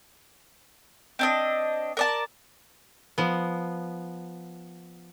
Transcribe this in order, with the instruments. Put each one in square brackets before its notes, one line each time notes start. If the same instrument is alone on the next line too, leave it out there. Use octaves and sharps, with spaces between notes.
[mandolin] C4 D4 D#5
A#4 D5 A5
[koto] F3 B3